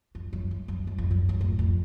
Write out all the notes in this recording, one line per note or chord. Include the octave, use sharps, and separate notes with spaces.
F2
F#2
F#2
F#2
F#2
F2
F#2
F#2
A2
F2